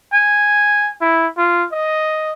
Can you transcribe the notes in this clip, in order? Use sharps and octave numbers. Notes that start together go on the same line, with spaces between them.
G#5
E4
F4
D#5